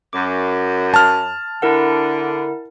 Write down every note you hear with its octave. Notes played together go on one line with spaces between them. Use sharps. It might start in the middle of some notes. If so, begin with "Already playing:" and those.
F#2 D6
A5 F6
D3 E4 A#4 F#5